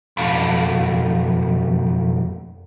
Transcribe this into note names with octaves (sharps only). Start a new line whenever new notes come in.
B1 F2